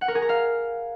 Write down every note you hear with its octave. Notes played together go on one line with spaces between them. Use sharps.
F#5
A#4
G#4
A#5
F5